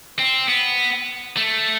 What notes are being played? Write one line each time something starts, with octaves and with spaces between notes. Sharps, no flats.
C4
B3
A3